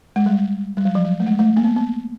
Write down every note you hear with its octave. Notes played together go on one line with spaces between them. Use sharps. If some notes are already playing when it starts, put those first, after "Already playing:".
G#3
G3
G3
F#3
F3
F#3
A3
G#3
A3
A#3
B3
B3